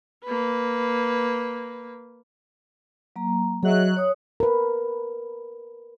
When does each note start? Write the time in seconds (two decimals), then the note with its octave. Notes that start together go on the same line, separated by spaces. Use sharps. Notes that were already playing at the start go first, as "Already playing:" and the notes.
0.24 A#3 B4
3.16 F#3 A#3 A#5
3.63 F#3 G#4 D#5 E5 F#6
3.97 C#5 D#6
4.40 A#4 B4